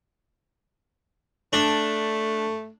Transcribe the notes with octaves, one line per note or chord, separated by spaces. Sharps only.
A3 D4